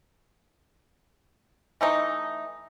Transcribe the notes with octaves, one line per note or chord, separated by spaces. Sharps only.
E3 A3 D#4